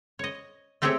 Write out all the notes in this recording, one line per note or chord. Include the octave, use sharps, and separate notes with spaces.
C#5 D#5
A3 C4 G4 G#4 C#5 E5